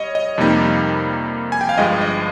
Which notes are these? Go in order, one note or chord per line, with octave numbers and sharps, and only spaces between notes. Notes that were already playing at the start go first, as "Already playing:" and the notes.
Already playing: G3 C#5 D#5
D#5
F2 C3 G3 A#3 D#4
G#5
G5
F5
G1 G2 F3 G#3 D#5
D#5